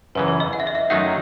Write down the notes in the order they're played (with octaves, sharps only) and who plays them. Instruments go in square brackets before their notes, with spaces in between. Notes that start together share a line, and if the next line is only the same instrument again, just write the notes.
[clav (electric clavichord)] F#2 C#3 E3 [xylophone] B4
[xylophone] B4
D#5
F#5
E5
D#5
E5
[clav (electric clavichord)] F#2 D#3 F#3 A3 D#4 [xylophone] F#5